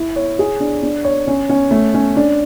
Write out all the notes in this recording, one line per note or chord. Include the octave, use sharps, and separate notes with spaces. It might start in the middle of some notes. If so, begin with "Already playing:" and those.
Already playing: E4
C#5
G#4
D4
D4
C#5
C#4
C#4
A3
C#4
D4